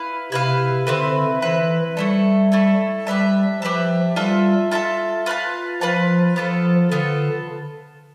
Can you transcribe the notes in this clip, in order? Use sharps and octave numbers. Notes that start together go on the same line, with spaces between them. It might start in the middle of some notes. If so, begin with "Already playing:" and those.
Already playing: E4 B4 F5
C3 E4 B4 F5
D3 C4 E4 B4
E3 C4 E4 B4
G3 A3 E4 A4
A3 E4 A4
G3 G4 B4 E5 A5
F3 G4 B4 E5 A5
G3 F4 A4 E5 A5
F4 A4 E5 A5
F4 B4 F5 A5
F3 F4 B4 F5 A5
F3 B3 F4 A4
D3 B3 F4 A4